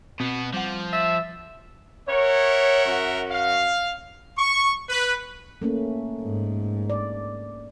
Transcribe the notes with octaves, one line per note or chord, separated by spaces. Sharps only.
B2 B3 C4
F3 G3 F#5
E5 A6
A#4 C#5 E5 F#5
F#2 C#4 F#4
F5
C#6
B4
A3 A#3 C#4
G#2
D5